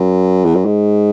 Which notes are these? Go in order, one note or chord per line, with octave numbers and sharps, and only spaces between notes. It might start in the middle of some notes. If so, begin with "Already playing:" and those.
Already playing: F#2
E2
F#2
G#2